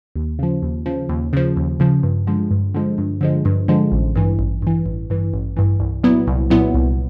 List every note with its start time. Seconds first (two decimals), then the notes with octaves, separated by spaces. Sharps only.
0.16 D#2
0.39 C#3 F3
0.62 D#2
0.86 C#3 F3
1.09 D#2
1.33 C#3 F3
1.57 D#2
1.80 C#3 F3
2.03 G2
2.27 D3 F3 G#3
2.51 G2
2.74 D3 F3 G#3
2.98 G2
3.21 D3 F3 G#3
3.45 G2
3.68 D3 F3 G#3
3.92 A1
4.16 G2 E3
4.39 A1
4.62 G2 E3
4.86 A1
5.10 G2 E3
5.33 A1
5.57 G2 E3
5.80 C2
6.03 A#2 F#3 B3 E4
6.27 C2
6.50 A#2 F#3 B3 E4
6.74 C2